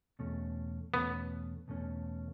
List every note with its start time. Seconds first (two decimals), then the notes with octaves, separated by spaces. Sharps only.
0.19 E2 B2 A3 C#4
0.93 E2 B2 A3 B3 C#4
1.68 E2 B2 A3 C#4